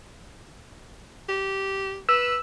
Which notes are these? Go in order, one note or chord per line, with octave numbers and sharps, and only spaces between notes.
G4
B4 E6